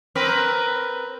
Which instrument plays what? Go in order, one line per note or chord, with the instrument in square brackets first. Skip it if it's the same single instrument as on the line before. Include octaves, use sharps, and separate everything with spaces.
[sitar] C4 A#4 B4